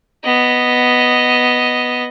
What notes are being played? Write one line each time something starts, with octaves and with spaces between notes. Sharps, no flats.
B3 D#5